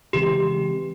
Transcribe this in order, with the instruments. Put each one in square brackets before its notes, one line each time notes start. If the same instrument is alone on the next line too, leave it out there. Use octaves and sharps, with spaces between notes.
[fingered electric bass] C#3 E3 G#3 C4 [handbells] G4